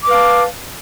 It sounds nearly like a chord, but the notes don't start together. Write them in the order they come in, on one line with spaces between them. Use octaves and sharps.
D6 B4 F5 A5